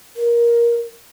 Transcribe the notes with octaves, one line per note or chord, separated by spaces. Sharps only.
A#4